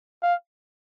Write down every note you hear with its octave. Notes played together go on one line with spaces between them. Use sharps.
F5